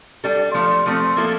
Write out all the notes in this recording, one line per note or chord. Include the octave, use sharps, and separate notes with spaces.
G3 D4 A4
F3 A3 D4
F3 A3 C4
F3 A#3 E4 A4